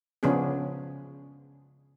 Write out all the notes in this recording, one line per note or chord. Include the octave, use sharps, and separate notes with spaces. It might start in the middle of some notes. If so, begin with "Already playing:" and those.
C#3 F3 B3 C#4 D4 G#4